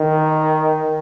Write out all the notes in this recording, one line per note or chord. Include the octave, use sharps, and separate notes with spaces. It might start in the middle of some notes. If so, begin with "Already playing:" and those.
Already playing: D#3